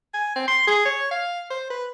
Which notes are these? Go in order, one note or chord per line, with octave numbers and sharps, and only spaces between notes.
G#5
C4
C6
G#4
C#5
F5
C5
B4